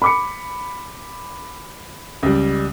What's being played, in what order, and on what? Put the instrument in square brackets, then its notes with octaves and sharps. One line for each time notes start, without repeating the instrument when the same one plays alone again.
[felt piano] B5 D6 C#7
[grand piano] C#2 G3